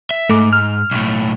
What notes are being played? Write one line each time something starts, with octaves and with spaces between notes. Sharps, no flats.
E5
G#2 A3 D6
F6
B1 A2